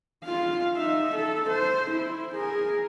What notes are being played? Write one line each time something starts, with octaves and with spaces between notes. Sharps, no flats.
F4 F5
D#4 E5
A4
C5
E4
G#4 A#4